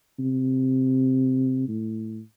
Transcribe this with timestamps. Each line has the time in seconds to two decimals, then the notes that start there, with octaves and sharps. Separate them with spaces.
0.19 C3
1.69 A2